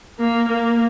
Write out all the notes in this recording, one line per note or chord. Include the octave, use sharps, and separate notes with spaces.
A#3
A#3